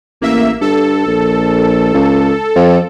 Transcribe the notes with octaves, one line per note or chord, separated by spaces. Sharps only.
A1 A#3 E5
G2 A4
A#1
C#2
F2